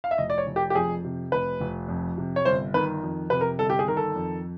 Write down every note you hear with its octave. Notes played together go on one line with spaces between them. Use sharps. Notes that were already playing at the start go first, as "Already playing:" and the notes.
F5
E5
F1 D#5
D5
C#5
F1
G4
G4
F2 G#4
C3
F1 B4
F1
F2
C3
C#5
G1 C5
D#3 B4
F2
C3 B4
A#4
G1 A4
G4
G#4
D#3 A#4
A4
F2